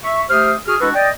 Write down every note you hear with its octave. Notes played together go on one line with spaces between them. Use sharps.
E5 C#6
A3 G4 C5 D#6 F6
F#4 G#4 F6
G#3 D4 E4 F#4 A4 B4
D5 D#5 G5